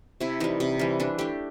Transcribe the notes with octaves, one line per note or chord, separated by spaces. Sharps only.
C3 E4
E3 G3 D#4
C3
E3 G3
E3 D4
A3 D4 G4